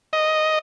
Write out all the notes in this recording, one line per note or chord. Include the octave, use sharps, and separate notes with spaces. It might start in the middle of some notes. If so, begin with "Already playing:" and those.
D#5